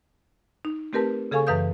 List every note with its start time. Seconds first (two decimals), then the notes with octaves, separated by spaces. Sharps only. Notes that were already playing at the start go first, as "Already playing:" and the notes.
0.65 D#4
0.93 A3 C4 G4 A#4 B4 A5
1.31 C#3 G#4 A4 F5 G#5 C#6
1.47 F#2 E3 B4 F5 D#6 G6